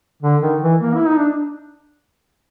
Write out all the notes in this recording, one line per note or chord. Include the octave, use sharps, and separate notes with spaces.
D3
D#3
E3
A#3
E4
D#4
D4